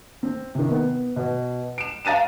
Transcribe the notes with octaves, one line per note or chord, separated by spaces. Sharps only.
C4
C3 D#3
B3
B2
D7 E7
F5 A#5 A6 D#7 E7